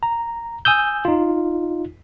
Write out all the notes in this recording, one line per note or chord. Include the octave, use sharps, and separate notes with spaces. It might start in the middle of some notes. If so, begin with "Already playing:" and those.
A#5
G#5 D#6 E6 G6
D#4 F4